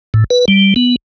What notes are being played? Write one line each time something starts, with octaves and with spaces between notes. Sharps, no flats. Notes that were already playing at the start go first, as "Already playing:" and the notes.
A2
B4
G3
B3